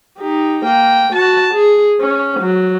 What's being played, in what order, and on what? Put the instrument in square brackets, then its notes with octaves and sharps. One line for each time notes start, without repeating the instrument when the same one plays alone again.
[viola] D#4 G4
A#3 G5
F#4 A5
G#4
C#4
F#3